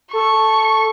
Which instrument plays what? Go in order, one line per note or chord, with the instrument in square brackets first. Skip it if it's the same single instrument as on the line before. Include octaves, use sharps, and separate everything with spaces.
[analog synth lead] A4 [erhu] C#6